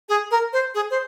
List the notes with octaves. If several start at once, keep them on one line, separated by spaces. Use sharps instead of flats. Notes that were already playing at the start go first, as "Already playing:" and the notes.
G#4
A#4
C5
G#4
C5